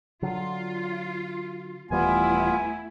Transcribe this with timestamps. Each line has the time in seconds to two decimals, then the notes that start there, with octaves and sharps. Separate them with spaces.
0.22 D3 F#3 F4
1.91 D#1 E3 G3 A3 B3 E4 F4 G#5